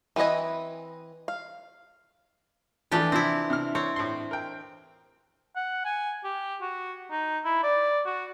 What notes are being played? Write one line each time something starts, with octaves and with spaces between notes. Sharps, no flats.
E3 C4 B4 D#5 G#5
F5
E3 F3 A3 D4 G4
C3 F3 C4 E4
C3 F6
C4 C#5
A2 C6
A#4 G5
F#5
G#5
G4
F#4
D#4
E4
D5
F#4